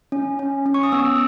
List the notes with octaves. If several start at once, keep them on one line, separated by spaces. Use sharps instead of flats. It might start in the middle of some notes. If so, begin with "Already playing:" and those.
C#4
C#4
C#4
C#6
D#6
B3 E6